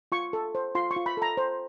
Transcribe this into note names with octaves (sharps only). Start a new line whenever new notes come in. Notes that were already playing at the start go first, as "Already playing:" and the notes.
F4 C#6
A4
C5
F4 C6
C#6
F4
B5
A4 A#5
C5